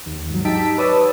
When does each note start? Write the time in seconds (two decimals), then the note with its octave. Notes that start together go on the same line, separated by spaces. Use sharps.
0.06 D#2
0.30 G#2 F#3
0.45 D#4 G4 A5 E6 B6 D7
0.78 B4 C#5 D5 A5 D#6 E6